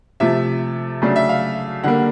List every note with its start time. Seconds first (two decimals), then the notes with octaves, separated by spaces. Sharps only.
0.20 C3 F3 A3 E5
1.02 C#3 F#3 A3 D4
1.16 E5
1.29 F5
1.84 D3 G3 A#3 F#5